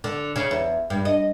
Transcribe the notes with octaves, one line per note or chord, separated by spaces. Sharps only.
D3
C#3
E2
G2
D#5